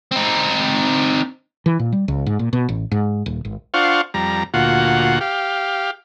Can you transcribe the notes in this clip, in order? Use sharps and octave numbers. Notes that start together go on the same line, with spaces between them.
C4 D#4
E3
A#2
G3
C#2
G#2
A#2
B2
A1
G#2
D#1
G#1
D4 F4 C5 F5 F#5 C#6
F2 G3 A#5
D2 A#2 F4 F#4 F#5
G4 F5